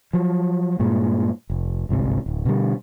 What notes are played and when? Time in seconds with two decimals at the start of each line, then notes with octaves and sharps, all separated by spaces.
0.13 F3 F#3
0.80 G2 A#2 G#3
1.50 F1
1.89 G1 C2 G#2 C3
2.26 D1
2.45 B2 D3 G3